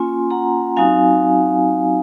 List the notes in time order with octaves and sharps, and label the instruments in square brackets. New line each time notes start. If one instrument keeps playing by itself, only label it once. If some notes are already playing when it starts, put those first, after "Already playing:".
Already playing: [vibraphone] A#3 C#4 F4 G#5 C6
F#5 A#5
F#3 C4 D#4 F#4 F5 G#5